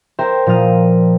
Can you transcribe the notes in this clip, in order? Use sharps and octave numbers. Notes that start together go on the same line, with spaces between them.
A#4 C5 E5 G5
A#2 F3 C5 D#6 F6